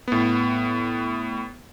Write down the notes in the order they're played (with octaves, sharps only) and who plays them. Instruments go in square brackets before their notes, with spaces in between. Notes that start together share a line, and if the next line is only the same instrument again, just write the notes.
[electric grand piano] A2 B3